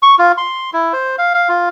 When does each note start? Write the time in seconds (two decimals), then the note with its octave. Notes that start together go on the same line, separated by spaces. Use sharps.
0.03 C#6
0.19 F4
0.37 C6
0.73 E4
0.93 C5
1.18 F5
1.34 F5
1.49 F4